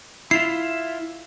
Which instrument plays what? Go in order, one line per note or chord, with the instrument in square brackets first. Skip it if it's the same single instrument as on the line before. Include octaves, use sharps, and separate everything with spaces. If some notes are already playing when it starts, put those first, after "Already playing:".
[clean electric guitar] E4 F4 E5 [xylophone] C7